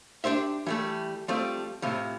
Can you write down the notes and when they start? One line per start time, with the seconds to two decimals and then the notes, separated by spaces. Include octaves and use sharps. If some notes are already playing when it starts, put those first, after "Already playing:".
0.24 D4 G4 C5 E5
0.67 E3 G3 A3
1.28 F3 G3 A3 C4
1.82 A2 C3 F3